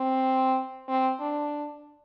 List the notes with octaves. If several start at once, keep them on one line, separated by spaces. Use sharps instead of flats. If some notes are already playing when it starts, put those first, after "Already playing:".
Already playing: C4
C4
D4